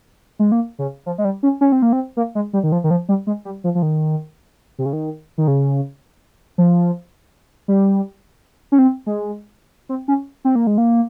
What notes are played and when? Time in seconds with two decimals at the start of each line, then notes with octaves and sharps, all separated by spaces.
0.39 G#3
0.52 A#3
0.79 C#3
1.06 F3
1.18 G#3
1.25 G3
1.43 C#4
1.61 C#4
1.72 C4
1.82 A#3
1.93 C4
2.17 A#3
2.35 G#3
2.53 G3
2.63 D#3
2.72 F3
2.84 D#3
2.91 F3
3.09 G3
3.27 G#3
3.45 G3
3.64 F3
3.75 F3
3.82 D#3
4.78 C3
4.86 C#3
4.93 D#3
5.38 D#3
5.48 C#3
6.58 F3
7.68 G3
8.72 C#4
8.78 C4
9.06 G#3
9.89 C4
10.08 C#4
10.45 C4
10.55 A#3
10.67 G#3
10.78 A#3